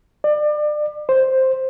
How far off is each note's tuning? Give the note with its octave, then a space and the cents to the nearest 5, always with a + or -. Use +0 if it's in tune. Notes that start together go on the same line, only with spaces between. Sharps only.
D5 +30
C5 +5